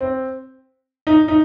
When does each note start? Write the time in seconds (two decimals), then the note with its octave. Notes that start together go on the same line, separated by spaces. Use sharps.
0.01 C4
1.07 D#4
1.28 D#4